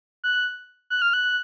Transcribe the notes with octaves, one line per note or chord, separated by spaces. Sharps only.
F#6
F#6
F6
F#6